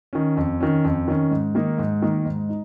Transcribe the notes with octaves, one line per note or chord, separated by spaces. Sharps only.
D#3 C#4
F2
D#3 C#4
F2
D#3 C#4
G#2
D#3 A#3 D#4
G#2
D#3 A#3 D#4
G#2
D#4